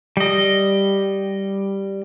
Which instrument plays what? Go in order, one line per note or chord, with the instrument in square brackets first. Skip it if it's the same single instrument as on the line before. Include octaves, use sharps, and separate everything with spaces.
[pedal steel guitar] G3 D#5